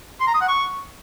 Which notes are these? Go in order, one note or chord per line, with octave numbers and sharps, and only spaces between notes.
C6
A#5
D#6
F#5
C#6